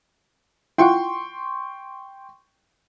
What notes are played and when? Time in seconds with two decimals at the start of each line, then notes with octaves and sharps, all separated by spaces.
0.78 E4 F4 F#5 G5 C6 C#6